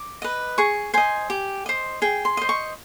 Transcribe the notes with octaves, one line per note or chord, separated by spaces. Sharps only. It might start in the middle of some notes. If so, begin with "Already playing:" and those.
Already playing: D6
B4 D#5
G#4 C#6
C5 D#5 G#5
G4
C5 D#5
G#4 G5
C6
C5 D#5
C#6